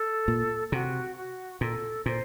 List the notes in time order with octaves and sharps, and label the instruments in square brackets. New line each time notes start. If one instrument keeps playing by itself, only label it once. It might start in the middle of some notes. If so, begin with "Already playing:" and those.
Already playing: [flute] A4
[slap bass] A#2
[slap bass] C3 [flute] F#4
[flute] F#4
[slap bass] A#2 [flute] A4
[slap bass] A#2 [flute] C5